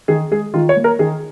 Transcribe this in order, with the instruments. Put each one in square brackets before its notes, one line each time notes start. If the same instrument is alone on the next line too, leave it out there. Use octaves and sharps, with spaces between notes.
[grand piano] D#3 G#4
G#3 G#4
D#3 F4
C#5
A#3
A#4
D#3 G#4